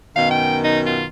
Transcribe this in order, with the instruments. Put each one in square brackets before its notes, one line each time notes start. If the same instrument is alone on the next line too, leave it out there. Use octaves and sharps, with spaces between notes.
[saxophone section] F#2 B2 D#3 [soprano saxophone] F5
[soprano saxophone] G5
D#4
F4